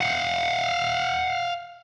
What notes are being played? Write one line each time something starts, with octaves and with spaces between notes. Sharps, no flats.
F5 F#5